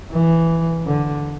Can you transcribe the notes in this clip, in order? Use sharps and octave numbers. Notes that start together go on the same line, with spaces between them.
E3
D3